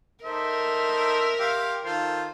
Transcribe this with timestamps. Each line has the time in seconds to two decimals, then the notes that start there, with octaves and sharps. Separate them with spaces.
0.24 D#4 A4 A#4 C5 E5
1.39 G4 F5 C6
1.85 D#3 F4 A4 C5